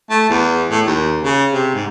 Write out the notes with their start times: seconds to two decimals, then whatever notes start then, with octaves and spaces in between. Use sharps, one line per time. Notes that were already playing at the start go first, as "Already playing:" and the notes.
0.10 A3
0.30 E2
0.70 A2
0.86 D#2
1.23 C#3
1.53 C3
1.74 G#2